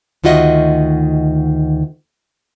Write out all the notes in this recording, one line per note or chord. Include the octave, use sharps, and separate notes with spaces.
D2 D#3 F4 F#4 D#5 E5